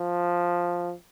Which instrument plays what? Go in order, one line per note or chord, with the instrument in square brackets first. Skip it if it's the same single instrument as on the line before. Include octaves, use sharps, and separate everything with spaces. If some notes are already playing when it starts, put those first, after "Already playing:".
Already playing: [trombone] F3